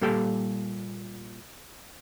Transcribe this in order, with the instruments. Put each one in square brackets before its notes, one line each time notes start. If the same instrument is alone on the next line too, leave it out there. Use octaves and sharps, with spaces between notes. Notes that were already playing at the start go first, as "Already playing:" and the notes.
[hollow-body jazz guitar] A#2 G3 G4 A4 F5 G5